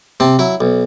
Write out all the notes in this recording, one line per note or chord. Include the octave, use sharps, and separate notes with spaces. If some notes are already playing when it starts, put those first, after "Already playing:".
C3 C4 A5
F#3 E4
B1